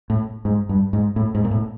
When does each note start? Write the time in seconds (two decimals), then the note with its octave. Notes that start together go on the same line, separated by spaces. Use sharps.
0.10 A2
0.45 G#2
0.69 G2
0.93 G#2
1.16 A2
1.35 G#2
1.45 A#2
1.51 A2